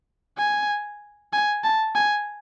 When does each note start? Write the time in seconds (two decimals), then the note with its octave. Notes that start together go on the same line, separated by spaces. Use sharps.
0.38 G#5
1.33 G#5
1.64 A5
1.95 G#5